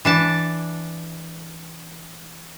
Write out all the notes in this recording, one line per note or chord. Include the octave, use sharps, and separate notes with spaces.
E3 D4 A5